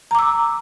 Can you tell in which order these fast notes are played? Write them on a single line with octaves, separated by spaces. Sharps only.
A#5 D6 E6